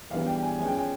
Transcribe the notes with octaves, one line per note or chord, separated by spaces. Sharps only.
E3 G3 B3 D4 F5
G5
G#5
F3 G#3 C#4 G#5
G5
G#5